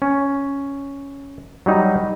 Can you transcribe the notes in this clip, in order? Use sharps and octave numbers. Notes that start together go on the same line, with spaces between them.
C#4
F#3 G3 D#4